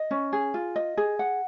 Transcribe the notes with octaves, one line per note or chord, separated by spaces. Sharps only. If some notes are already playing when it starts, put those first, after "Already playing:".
Already playing: D#5
C#4
G#4
F4
D#5
G#4
F#5